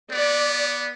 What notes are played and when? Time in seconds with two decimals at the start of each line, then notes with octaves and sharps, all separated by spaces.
0.11 B3 D5